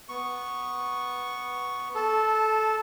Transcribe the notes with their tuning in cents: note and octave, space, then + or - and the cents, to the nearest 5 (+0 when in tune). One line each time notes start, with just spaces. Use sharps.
B3 +0 C#6 +0
A4 -15 A5 +0